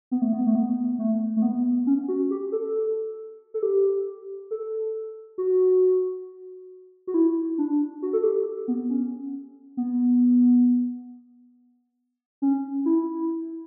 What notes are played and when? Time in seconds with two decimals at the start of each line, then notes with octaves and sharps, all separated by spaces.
0.11 B3
0.22 A3
0.33 B3
0.47 A3
0.55 B3
0.99 A3
1.37 A3
1.42 B3
1.87 C#4
2.08 F#4
2.31 G4
2.52 A4
3.54 A4
3.63 G4
4.51 A4
5.38 F#4
7.07 F#4
7.14 E4
7.58 D4
8.02 F#4
8.13 A4
8.24 G4
8.68 B3
8.90 C#4
9.77 B3
12.42 C#4
12.85 E4